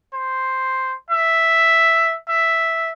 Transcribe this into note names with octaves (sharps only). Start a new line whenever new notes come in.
C5
E5
E5